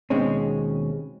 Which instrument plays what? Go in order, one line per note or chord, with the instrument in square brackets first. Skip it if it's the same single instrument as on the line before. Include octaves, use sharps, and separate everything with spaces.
[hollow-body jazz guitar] D#2 B2 G#3 C4 C#4